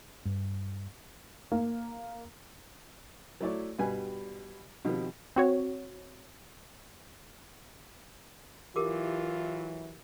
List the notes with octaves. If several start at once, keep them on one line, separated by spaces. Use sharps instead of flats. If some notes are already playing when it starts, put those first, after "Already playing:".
G2
A#3
F#3 A3 E4 C#5 D5
G2 B2 G3 B4 G#5
B2 D#3 F3 G3 C4
C4 F#4 C#5
E3 F#3 E4 F4 G4 A#4 D6